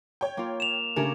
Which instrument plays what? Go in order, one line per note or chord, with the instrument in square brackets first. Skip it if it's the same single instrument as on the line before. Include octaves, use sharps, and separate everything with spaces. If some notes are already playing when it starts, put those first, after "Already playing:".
[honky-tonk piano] C#5 G5
[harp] A#3 F4
[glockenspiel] E7 F7
[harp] C#3 C#4 D4 [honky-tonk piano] A3 G4 A#4